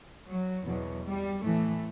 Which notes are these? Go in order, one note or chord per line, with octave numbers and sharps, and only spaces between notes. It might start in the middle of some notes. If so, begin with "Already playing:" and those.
F#3
E2 B2 F#3
G3
A2 E3 A3